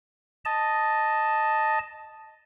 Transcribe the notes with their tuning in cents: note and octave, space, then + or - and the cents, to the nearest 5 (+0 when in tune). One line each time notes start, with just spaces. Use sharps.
D#5 +0 A5 +0